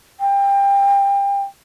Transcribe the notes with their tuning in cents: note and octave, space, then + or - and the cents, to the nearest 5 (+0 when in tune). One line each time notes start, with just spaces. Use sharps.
G5 +25